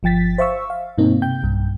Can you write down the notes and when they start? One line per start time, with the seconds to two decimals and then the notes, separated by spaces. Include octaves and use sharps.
0.03 G1 F3 G5 A6 B6
0.38 C5 E5 F5 C#6 E6
0.70 F5
0.98 G2 B2 A#3 C4 D#4
1.22 C3 G5 G6
1.43 B1 G2